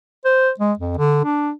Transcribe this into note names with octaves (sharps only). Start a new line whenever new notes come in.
C5
G#3
F2
D3
D4